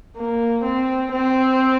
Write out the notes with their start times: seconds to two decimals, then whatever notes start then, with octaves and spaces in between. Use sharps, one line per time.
0.17 A#3
0.64 C4
1.12 C4